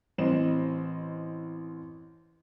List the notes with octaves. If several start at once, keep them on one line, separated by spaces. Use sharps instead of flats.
A1 C4 C5 D#5 E7